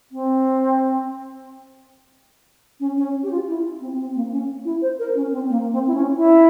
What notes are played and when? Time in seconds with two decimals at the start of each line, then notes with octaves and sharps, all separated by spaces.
0.12 C4
2.80 C#4
2.97 C#4
3.23 G4
3.31 F4
3.48 E4
3.81 C4
3.99 C4
4.16 A#3
4.32 C#4
4.65 E4
4.82 C5
4.99 A#4
5.15 C#4
5.32 C4
5.49 A#3
5.72 C4
5.87 E4
5.94 C#4
6.16 E4